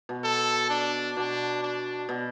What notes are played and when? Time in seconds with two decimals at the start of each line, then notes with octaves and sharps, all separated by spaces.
0.09 B2
0.24 A4
0.70 D4
1.17 B2 D4
1.63 D4
2.09 B2